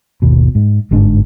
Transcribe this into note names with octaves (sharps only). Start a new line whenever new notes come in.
G#1 D#2 B2
G#2
G1 G#2 G#3 D4